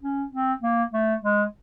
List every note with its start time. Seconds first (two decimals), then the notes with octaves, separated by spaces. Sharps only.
0.03 C#4
0.32 C4
0.62 A#3
0.93 A3
1.23 G#3